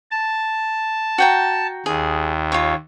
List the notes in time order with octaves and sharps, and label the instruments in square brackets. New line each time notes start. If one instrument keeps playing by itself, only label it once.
[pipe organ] A5
[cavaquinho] F#4 G5 A#5
[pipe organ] D#2 [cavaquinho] G#4
[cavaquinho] F4 C#5